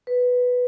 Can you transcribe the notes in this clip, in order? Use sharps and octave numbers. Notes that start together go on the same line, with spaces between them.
B4